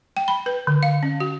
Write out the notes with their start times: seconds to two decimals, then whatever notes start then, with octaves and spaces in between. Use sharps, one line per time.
0.17 G5
0.28 B5
0.46 B4
0.67 D3
0.83 F5
1.03 C#4
1.20 F#4